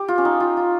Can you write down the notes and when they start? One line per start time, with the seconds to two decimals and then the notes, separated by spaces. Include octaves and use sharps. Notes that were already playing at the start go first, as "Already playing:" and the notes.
Already playing: G4
0.08 F4
0.18 C#4
0.25 D#4
0.40 F4
0.57 F4